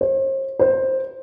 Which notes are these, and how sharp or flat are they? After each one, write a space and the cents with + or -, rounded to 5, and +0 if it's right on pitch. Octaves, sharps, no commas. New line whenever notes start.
C5 +45
C5 +10